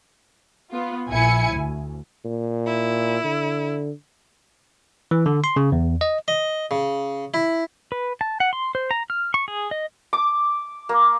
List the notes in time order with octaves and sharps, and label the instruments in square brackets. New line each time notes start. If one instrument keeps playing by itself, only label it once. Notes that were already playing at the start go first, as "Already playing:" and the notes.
[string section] B3 F4
A#1 E4 G#5 C#7
D2
[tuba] A#2
[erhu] E4
[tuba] D3
[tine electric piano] E3
D3
C6
C#3
E2
D#5
[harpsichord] D#5
C#3
E4
[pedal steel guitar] B4
A5
F#5
C6
C5
A#5
F6
C#6
G#4
D#5
[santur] D6
A#3